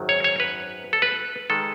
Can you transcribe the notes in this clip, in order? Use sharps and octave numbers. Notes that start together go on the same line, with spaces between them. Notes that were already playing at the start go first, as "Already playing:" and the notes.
Already playing: G#1 F#2 D#3 F#3
C#5
C#5
B4
A4
B4
D#3 G#3 A4